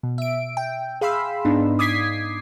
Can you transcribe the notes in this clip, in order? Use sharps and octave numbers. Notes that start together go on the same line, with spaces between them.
B2
E5 D7
G5
G#4 F5 B5 C6 E6
G#2 B3 D4 D#4
D6 D#6 G#6 B6 C7